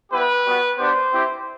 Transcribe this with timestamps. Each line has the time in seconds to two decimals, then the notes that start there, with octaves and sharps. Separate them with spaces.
0.12 G3 B3 E4 G4 B4
0.45 G3 B3 F#4
0.78 B3 D4 G4 C5
1.12 C4 E4 G4